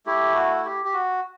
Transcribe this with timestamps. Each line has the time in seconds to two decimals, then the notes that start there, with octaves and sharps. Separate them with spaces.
0.06 A3 E4 G4
0.35 F#4
0.65 G4
0.85 G4
0.94 F#4